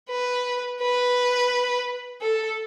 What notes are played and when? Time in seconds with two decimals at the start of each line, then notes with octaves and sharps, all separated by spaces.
0.10 B4
0.81 B4
2.22 A4